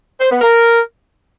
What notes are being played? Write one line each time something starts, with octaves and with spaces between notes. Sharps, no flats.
C5
B3
A#4